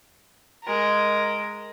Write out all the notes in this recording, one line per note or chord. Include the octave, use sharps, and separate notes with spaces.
G#3 A#4